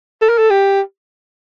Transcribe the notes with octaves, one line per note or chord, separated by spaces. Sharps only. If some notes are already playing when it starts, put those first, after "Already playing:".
A4
A#4
A4
G4